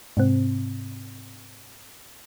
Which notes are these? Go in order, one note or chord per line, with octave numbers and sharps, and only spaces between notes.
G#2 C3 C4